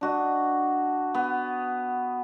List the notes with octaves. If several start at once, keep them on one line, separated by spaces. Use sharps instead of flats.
D4 F#4 D#5
B3